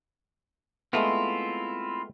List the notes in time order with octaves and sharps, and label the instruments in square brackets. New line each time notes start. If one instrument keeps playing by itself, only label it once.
[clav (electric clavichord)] G#3 A3 B3 [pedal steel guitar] C4 E4 F4